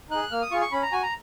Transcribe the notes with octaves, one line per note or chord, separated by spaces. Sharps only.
D#4 G#4 F#6
A#3 F6
D#6
F4 G#4 C#6
C#6
C#4 B5
A#5
F#4 G#5
A#5